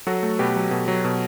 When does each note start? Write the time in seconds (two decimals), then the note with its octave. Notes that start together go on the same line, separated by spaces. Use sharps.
0.07 F#3 F#4 A4
0.23 A3
0.39 B2 G4 B4
0.56 F#3
0.71 B2
0.88 F#3
1.04 B2